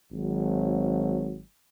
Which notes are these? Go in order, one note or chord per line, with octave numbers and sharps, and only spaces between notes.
G#1 F#3